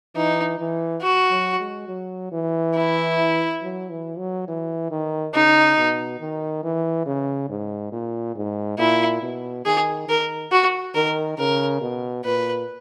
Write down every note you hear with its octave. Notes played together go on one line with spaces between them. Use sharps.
E3 D#4
E3
F#4
F#3
G#3
F#3
E3
E4
F#3
E3
F#3
E3
D#3
C#3 D#4
B2
D#3
E3
C#3
G#2
A#2
G#2
A#2 E4
B2
D#3 G#4
D#3 A#4
F#4
D#3 A#4
C#3 A#4
B2
A#2 B4